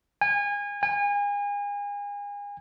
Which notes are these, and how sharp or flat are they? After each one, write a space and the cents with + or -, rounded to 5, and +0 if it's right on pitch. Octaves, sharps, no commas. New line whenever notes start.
G#5 -30
G#5 -35